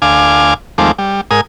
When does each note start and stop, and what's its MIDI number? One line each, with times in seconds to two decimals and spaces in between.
0.02 0.54 38
0.02 0.54 77
0.02 0.54 80
0.02 0.54 86
0.78 0.91 39
0.78 0.91 53
0.78 0.91 56
0.78 0.91 57
0.78 0.91 60
0.78 0.91 86
0.98 1.21 55
1.31 1.41 44
1.31 1.41 70
1.31 1.41 80
1.31 1.41 87